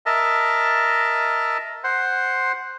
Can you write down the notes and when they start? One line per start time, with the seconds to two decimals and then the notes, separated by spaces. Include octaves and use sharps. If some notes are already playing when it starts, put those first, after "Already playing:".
0.06 A#4 D#5 E5 A5
1.84 C5 F#5 C6